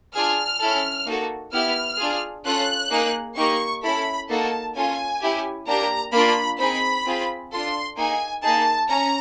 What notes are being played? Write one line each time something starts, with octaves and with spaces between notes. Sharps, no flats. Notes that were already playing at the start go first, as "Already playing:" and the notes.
D4 F4 G#4 F6
C#4 E4 A4
A#3 D#4 F#4 A4
B3 E4 G4 F6
D4 F4 G#4
C#4 F4 A4 F#6
A#3 D#4 G#4
A#3 D#4 G4 C#6
C#4 E4 A4 B5
A#3 D#4 F#4 A4 A5
C#4 F4 A4 G#5
C#4 E4 G4
A#3 D4 G4 A#5
A#3 D4 F4 B5
C4 D#4 G#4 B5
C4 F4 G#4
D4 F4 A4 C6
A#3 D#4 G#4 G#5
A#3 D#4 G#4 A5
C#4 A#5